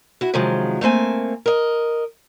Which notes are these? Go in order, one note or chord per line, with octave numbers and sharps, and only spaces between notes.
E4 F#4
C3 D#3 F3 F#3 G#3
A3 A#3 C4 G#5
A#4 D#5